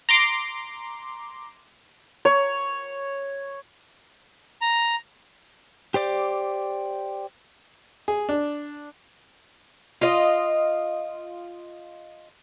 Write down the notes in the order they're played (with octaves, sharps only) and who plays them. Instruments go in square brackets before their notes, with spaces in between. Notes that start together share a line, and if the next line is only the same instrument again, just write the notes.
[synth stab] A#5 C6 D6
[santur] C#5
[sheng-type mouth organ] A#5
[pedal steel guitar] G4 C5 D5 D6
[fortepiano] G#4
D4
[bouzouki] F4 D#5